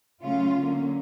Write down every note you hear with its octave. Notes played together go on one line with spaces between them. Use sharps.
C#3 F#3 A3 C#4 F4
D3 F#3 A#3 C#4